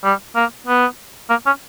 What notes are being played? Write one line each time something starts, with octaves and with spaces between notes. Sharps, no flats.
G3
A#3
B3
A#3
C#4